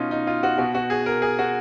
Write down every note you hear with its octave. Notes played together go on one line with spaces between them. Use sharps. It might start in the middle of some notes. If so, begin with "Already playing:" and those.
Already playing: B2 C#4 D#4 F4
D#4
F4
F#4
B2 F#4
F#4
G#4
A#4
G#4
F#4